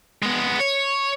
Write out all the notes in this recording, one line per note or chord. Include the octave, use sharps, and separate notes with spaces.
G#3 B3
C#5